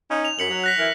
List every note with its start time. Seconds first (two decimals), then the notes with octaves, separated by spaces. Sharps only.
0.10 C#4 D#4
0.25 F7
0.39 F#2 B6 C#7 F#7
0.50 F#3
0.64 F#6 A#6 B6
0.78 E3 E4 A#4